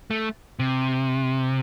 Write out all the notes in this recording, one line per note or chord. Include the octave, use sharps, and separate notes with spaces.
A3
C3